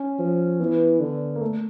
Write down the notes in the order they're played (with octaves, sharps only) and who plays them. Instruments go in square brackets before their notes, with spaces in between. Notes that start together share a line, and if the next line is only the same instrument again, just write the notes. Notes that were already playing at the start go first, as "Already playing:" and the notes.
Already playing: [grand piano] C#4
[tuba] F3
[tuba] E3 [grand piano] B3
[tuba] D3
[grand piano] A#3
A3